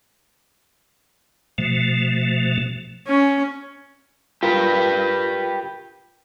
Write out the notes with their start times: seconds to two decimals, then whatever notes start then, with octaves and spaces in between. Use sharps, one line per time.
1.58 B2 F3 A3
3.07 C#4
4.43 F4 G4 A#4 B4